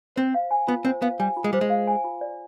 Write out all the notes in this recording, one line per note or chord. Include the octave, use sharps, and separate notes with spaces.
C4 C5
F5
G#5
B3 F4
C4 C5
B3 F5
G3 G#5
F4
G#3
G3 C5
G#3
F5
G#5
F4
D5